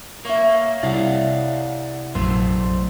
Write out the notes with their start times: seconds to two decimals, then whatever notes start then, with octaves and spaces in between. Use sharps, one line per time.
0.25 A#3 C#5 E5
0.83 C2 D5 F5 F#5
2.15 A#1 F#2 F#3 A3 C5 C6